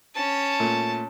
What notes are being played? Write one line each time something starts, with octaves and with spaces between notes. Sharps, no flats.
C#4 A5
A#2 A3